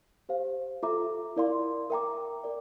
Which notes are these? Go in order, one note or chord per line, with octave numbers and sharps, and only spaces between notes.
G4 C5 F5
F4 A4 E5 A#5 D6
E4 A#4 D5 F5 C6
A#4 E5 G5 A#5 D6
A#4 D5